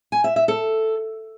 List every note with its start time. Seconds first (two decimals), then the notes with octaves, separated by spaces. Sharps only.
0.12 G#5
0.24 E5
0.36 E5
0.48 A4